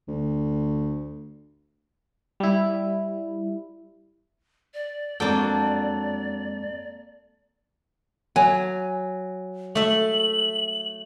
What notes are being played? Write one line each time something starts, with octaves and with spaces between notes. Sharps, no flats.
D2
G3 E4
D5
F2 F#3 G#3 A#3 C4 D4 A4 G5
F#3 G#5
A3 E5 F#7